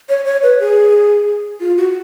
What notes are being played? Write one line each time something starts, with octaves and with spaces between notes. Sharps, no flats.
C#5
C#5
B4
G#4
F4
F#4